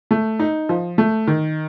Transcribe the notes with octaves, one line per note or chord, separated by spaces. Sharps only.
A3
D#4
F3
A3
D#3